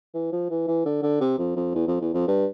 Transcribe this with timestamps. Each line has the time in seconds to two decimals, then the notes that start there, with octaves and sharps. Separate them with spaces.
0.14 E3
0.32 F3
0.50 E3
0.67 E3
0.86 D3
1.03 D3
1.21 C3
1.38 F2
1.56 F2
1.75 E2
1.88 F2
2.01 E2
2.14 F2
2.28 G2